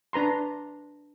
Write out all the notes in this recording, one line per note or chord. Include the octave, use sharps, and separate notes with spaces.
D4 B4 A#5 C6